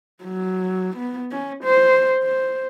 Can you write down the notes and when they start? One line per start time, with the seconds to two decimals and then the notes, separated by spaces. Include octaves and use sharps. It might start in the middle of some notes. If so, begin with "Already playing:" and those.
0.24 F#3
0.97 B3
1.31 C#4
1.64 C5
2.23 C5